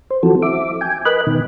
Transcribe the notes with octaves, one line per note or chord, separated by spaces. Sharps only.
C5
E3 F3 C4 F#4 A4
E5 D6
G5 G#5
A#4 B4 D#5 B5 F#6
B2 D#3